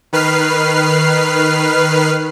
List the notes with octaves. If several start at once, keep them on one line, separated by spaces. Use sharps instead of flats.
D#3 B4 F6 C7